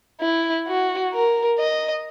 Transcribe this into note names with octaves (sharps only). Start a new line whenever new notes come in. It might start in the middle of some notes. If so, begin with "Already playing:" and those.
E4
F#4
A#4
D#5